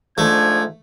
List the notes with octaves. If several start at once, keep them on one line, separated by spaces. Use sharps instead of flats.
G#2 F3 A3 D4 G#6